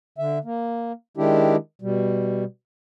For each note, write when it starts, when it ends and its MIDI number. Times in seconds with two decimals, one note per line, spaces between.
0.18 0.38 50
0.18 0.38 76
0.44 0.92 58
1.17 1.56 51
1.17 1.56 56
1.17 1.56 62
1.17 1.56 64
1.17 1.56 67
1.82 2.44 47
1.82 2.44 55